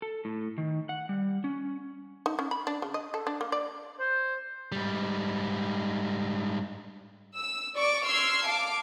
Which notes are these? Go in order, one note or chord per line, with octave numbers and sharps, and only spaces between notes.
A4
A2
D#3
F#5
G3
C#4
D#4
C#4
B5
D4
C#3
D#5
A4
D4
A#3
D5
C5
G#2 G3
E6
D5 C#6 D6
C6 E6 F6 G#6 C7
F5 A5 D6